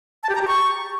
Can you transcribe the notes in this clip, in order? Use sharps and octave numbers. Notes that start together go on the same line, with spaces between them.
A5
G4
A#5
G4
C#6